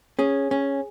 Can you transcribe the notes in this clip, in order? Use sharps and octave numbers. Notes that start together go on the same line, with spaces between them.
C#4 G#4
C#4